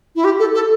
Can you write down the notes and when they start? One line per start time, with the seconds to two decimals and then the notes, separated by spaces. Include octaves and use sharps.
0.16 E4
0.24 G4
0.40 A4
0.55 A4